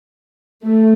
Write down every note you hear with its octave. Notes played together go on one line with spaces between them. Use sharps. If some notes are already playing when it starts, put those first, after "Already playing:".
A3